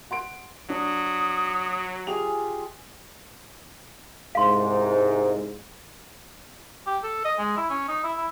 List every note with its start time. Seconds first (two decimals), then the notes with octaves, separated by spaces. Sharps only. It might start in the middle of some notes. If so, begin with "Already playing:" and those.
0.11 F#5 C6 D7
0.70 F#3 D4 D#6
2.07 F4 G4 G#4 G#5 F7
4.35 C2 G#2 F5 C6
6.87 G4
7.03 A4
7.25 D#5
7.38 G#3
7.57 E4
7.70 C#4
7.88 D#4
8.04 E4
8.17 E4